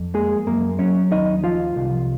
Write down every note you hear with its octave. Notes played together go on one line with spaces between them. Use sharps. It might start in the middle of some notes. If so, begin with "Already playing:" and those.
Already playing: F2
G#3 A#3 G#4
F#2 A#3 A#4
F#3 C#4 C#5
D#2 D#4 D#5
F3 F4 F5
C2